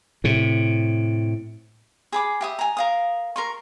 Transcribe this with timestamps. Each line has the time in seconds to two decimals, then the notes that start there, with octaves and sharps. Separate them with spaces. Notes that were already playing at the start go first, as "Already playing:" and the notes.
0.24 A2 C3
2.12 G#4 B5 D6
2.41 G4 E5 D#6
2.59 G#5 A#5
2.77 A#4 F5 D#6
3.36 A#4 C6 C#6